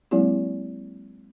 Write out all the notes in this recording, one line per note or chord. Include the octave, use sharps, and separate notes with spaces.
F#3 G#3 A#3 C4 E4 G4